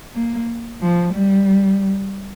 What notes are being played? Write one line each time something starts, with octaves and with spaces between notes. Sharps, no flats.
A#3
F3
G3